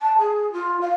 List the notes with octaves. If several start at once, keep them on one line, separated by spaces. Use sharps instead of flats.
A5
G#4
F4
F5